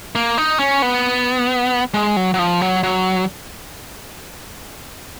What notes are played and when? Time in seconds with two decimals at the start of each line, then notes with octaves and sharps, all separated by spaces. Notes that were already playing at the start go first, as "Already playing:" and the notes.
0.15 A#3
0.38 D#4
0.59 C#4
0.82 B3
1.94 G#3
2.17 F#3
2.34 F#3
2.39 F3
2.61 F#3
2.83 F#3